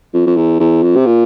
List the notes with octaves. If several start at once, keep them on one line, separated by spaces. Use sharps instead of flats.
F2
F2
E2
E2
F2
C3
A#2